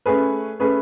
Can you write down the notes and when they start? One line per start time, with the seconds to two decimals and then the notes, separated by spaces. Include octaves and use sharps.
0.06 A3 C#4 G#4 B4
0.60 A3 C#4 G#4 B4